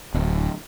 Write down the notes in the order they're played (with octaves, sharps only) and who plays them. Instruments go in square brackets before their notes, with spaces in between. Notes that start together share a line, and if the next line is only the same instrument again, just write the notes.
[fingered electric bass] D1